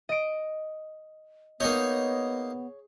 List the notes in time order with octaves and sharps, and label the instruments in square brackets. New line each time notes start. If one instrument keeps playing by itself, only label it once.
[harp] D#5 D7
[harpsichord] A#3 D#4 D#5 [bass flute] B3 [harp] G#4 G6 [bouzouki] C#5